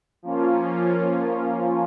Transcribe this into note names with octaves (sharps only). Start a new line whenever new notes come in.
F3 A#3 C#4 F4